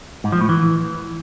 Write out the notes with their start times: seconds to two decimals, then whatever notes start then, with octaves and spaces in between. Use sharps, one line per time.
0.24 G#2
0.32 F3
0.41 A2
0.49 E3